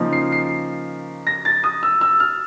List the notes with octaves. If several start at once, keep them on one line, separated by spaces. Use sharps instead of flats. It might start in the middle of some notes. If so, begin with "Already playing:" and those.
Already playing: C#3 F3 A#3 D#4
C7
C7
A#6
A6
D#6
E6
E6
F6